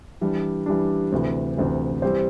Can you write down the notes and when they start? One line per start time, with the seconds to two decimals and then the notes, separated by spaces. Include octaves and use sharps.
0.21 E3 G3 D4
0.66 E3 G3 D4
1.12 D2 C3 E3
1.57 D2 C3 E3
2.02 E3 G3 C4 G4 C5